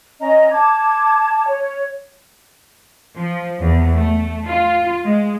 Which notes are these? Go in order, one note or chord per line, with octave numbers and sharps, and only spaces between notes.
C#4 D#5 A#5
A5 D6 G#6
C#5
F3
E2
A3
F4
G#3